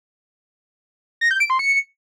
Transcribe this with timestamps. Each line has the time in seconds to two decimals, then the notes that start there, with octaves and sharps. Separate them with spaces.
1.21 A#6
1.31 G6
1.40 D7
1.50 C6
1.59 C#7